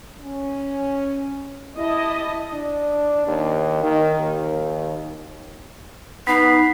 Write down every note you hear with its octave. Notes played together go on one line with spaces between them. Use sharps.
C#4
E4 G4 D#5 A5
D4
D#2
D#3
D#2
B3 D#4 B6 C7